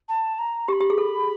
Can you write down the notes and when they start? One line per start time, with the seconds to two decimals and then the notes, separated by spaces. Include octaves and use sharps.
0.08 A5
0.38 A#5
0.68 G4 C#6
0.72 B5
0.81 G4
0.90 G#4
0.98 A4